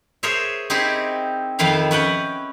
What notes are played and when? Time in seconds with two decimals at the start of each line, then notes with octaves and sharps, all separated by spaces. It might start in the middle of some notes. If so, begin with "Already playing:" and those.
0.23 G#4 A#4 C5 C#5 E5
0.70 C4 D#4 E4 G4 G#4
1.59 F2 D#3 F3 E4 F5
1.91 C#4 B4 F#5 G5